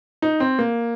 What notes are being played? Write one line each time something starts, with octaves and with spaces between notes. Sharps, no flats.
D#4
C4
A#3